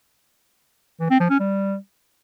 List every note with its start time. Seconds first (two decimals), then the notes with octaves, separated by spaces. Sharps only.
1.00 E3
1.10 C4
1.20 F3
1.30 C#4
1.40 G3